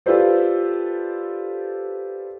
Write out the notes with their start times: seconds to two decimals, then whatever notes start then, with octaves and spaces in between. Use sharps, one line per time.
0.06 F4 G4 A4 B4 C5 D5